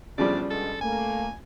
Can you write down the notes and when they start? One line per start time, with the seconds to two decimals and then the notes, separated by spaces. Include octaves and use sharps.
0.18 E2 A2 C#3 F3 G3 D4 D5
0.51 G2 B2 G#3 A4
0.81 A3 A#3 G#5